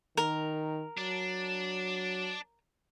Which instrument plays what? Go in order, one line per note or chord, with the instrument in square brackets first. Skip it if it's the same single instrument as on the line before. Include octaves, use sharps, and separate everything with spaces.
[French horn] D#3 [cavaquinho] A#4
[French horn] F#3 [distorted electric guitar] D4